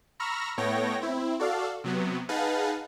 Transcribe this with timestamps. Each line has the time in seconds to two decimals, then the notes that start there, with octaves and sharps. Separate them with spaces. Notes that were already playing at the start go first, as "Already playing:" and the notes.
0.20 A#5 B5 C#6 E6 F6 A#6
0.57 A2 A3 B3 C#5 G5 A#6
1.01 C4 E4
1.40 F#4 A4 D5 F5
1.84 C3 F#3 B3
2.29 D#4 G#4 B4 F5 F#5 A5